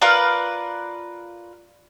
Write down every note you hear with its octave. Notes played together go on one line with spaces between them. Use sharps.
F4 A#4 B4 D5